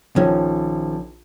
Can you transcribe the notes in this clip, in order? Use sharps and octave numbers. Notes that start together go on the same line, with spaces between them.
A#1 D#3 F3 C#4